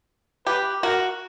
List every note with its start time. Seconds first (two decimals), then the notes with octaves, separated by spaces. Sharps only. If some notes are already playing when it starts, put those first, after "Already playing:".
0.46 G4 B4
0.83 F#4 A#4